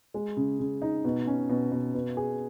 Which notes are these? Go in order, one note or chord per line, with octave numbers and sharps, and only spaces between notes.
G#3
C#3
C#3
D#4
B2
C#4
B2
B2
B2
G#4